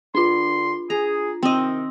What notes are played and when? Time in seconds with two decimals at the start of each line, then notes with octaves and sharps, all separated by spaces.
0.15 D3 D4 F4 C6
0.90 G#4 A#5
1.43 C3 D#3 C4 D#5